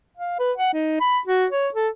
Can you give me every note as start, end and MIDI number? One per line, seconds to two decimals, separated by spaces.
0.17 0.35 77
0.39 0.52 71
0.58 0.73 78
0.73 0.96 63
1.00 1.19 83
1.28 1.46 66
1.52 1.68 73
1.74 1.88 69